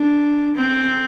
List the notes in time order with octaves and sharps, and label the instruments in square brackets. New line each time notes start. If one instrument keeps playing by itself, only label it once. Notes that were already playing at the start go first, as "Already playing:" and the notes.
Already playing: [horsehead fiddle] D4
C4